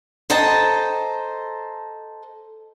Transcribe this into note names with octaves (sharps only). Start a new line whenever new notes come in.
A4 C5 D#5 G5 A5 A#5